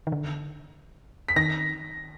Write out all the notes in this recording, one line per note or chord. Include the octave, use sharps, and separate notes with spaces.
D#3
D3
B6
D#3 A#6